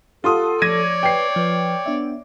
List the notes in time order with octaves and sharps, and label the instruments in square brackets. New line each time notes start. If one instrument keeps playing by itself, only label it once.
[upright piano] F4 C6 D#6 [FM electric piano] G4 F#5 A5 [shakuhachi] A4
[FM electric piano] F3 [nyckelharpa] C#5 D5 [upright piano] G#6 A#6 D#7
[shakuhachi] B4 [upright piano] G5 C7
[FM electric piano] F3 [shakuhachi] B4
[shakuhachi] B3 [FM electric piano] D4 E5